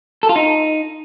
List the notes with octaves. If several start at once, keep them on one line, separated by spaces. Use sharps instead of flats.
A4
F4
D#4